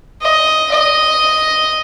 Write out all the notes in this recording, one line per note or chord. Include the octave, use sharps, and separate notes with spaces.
D#5
D#5